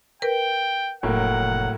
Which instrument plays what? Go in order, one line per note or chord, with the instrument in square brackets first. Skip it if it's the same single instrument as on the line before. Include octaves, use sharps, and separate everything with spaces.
[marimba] A#4 B4 [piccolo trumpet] G5
[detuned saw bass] F1 [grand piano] A2 F#3 A#3 [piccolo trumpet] F#5